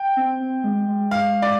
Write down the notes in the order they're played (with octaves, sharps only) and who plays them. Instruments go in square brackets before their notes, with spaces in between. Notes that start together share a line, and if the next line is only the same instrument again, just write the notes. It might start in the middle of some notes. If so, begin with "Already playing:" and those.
Already playing: [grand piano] G5
[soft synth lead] C4
C4
G#3
G#3
[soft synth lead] G#3 [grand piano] F5
[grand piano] D5